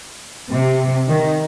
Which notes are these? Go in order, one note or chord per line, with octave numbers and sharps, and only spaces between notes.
C3
D#3